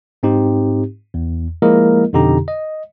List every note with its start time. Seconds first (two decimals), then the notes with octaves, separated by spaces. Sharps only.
0.23 G#2 C4 D#4 G4
1.14 E2
1.62 F3 G#3 A#3 E4 A#4 D#5
2.13 F2 B2 D3 D#4 G4 A#5
2.48 D#5